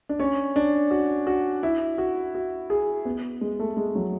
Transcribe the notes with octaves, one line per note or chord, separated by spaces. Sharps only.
D4
C#4
D4
F#4
F#4
E4
F#4
F#4
G#4
B3
G#3
A3
G#3
F#3